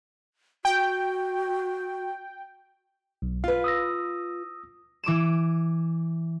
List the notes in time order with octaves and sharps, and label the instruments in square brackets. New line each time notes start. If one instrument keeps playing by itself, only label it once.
[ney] F#4 [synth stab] G5
[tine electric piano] B1
[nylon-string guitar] F4 B4 [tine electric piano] F5
[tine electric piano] D#6 E6 A#6
[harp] E3 D6 D#7 E7